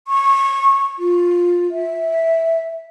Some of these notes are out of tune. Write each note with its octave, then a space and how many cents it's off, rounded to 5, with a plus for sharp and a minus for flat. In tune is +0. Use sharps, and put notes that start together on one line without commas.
C#6 -20
F4 +10
E5 -10